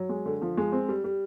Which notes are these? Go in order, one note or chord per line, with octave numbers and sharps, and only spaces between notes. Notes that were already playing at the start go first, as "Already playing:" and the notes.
Already playing: F#3
G#3
D3
F3
G#3
C4
G3
G3